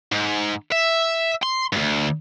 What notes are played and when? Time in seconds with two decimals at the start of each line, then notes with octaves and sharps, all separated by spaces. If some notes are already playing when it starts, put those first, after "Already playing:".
0.12 G#2
0.72 E5
1.43 C6
1.73 D2 G2